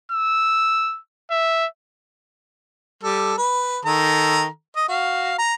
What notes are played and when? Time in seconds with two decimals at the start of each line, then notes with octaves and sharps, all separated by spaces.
0.12 E6
1.31 E5
3.03 G3 A4
3.38 B4
3.85 D#3 A4 A#5
4.76 D#5
4.88 F#4 F5
5.39 A#5